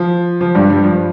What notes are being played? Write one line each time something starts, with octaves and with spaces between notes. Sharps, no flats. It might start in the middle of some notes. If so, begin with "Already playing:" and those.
Already playing: F3
F3
G2 G3
G2 G3
F3